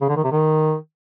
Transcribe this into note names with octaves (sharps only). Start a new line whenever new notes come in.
C#3
D3
D#3
C3
D#3